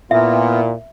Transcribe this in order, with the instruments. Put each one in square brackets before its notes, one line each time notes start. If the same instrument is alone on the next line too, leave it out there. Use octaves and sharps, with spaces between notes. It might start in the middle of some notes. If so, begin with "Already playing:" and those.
[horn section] A#2 [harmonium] B3 F4 [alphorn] E4 [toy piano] E5